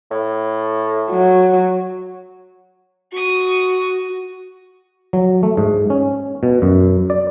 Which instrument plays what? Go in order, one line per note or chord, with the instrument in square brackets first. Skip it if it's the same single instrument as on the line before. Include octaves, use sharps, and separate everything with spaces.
[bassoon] A2
[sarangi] F#3
[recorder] F#4 [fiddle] C#6 D#6
[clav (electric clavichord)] F#3
A3
G#2
C#4
B2
F#2
D5